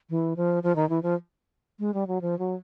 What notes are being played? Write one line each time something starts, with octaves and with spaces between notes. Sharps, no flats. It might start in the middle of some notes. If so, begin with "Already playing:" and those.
E3
F3
F3
D#3
E3
F3
G#3
G3
F#3
F3
F#3